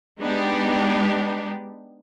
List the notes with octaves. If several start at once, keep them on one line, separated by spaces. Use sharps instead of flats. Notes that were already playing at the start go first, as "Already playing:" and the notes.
G#3 B3 D4 D#4 G4